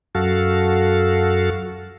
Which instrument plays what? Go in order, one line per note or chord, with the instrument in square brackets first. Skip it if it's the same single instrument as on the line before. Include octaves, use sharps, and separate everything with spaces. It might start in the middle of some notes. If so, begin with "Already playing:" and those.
[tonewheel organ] F#2 F#4 A4 F5